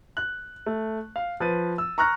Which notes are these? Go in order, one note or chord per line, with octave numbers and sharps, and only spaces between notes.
F#6
A3
F5
F3 B4 A6 D#7
E6
A#5 C#6 F6 F#6 A#6